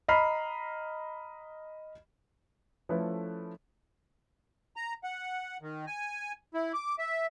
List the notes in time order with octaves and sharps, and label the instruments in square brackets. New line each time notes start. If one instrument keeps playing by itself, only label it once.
[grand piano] D#5 A#5 B5 F6 C7
F3 A3 C#4 E4 A4 B4
[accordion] A#5
F#5
D#3
G#5
E4
D6
E5